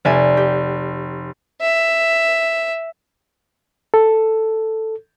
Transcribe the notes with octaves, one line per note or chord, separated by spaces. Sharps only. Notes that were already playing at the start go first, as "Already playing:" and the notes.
F1 D5 E5 G#5
G4
E5
A4